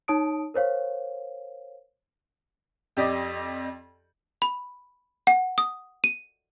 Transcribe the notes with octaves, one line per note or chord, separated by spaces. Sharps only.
D#4 C#5 A5 D#6 D7
A#4 C5 C#5 F5
F2 G4 D5 D#5
B5
F#5
D#6
D#7